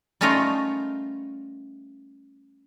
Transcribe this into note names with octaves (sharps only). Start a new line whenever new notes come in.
G3 A3 C#4 D#4 F4 A#4